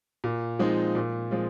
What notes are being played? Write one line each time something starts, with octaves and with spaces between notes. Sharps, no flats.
A#2
F3 G#3 C4 D#4
A#2
F3 G#3 C4 F4